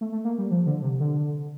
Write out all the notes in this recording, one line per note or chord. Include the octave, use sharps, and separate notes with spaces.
A3
A3
A#3
G3
F3
D3
C3
D3